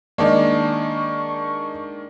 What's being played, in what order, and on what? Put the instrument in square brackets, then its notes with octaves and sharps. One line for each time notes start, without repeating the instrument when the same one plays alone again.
[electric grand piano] D#3 G#3 A#3 [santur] D4 B5 [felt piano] D5 D#5 [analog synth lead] C#6